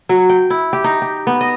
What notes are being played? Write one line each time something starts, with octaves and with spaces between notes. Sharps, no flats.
F#3
G5
E4
G4
D#4
G4
B3
D#5